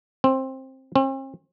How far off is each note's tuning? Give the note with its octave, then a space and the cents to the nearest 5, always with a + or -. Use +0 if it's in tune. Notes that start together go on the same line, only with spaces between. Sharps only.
C4 +15
C4 +45